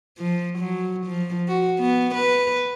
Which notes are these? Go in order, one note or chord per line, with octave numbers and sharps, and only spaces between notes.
F3
F#3
F3
F#4
B3
B4